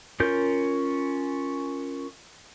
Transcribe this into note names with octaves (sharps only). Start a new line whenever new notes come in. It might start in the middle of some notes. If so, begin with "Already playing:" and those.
C#4 F4 A#4 G6